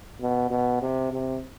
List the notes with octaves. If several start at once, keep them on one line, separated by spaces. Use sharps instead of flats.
B2
B2
C3
C3